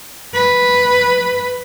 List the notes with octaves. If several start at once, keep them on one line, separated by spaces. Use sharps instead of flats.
B4